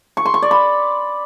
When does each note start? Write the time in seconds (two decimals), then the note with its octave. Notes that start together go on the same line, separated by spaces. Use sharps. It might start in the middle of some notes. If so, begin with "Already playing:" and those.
0.17 C#6
0.25 C6
0.34 C#6
0.42 D5
0.51 B5